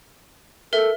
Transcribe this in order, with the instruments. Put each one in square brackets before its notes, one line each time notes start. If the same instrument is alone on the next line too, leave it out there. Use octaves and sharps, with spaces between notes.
[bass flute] A4 [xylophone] A#4 E5